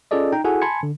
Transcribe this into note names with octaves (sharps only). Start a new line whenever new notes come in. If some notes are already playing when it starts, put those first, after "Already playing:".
C#4 F4 G#4 A4 D5 D#5
D#4 G5 A#5
E4 F#4 G#4 A4 F#5 G#5
G#5 A5 B5 C6 G#6 C#7
D3